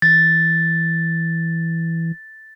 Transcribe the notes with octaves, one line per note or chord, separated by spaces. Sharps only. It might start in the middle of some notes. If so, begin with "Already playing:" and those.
E3 A6